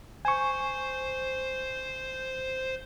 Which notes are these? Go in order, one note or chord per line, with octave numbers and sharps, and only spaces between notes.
C5 G#5 C#6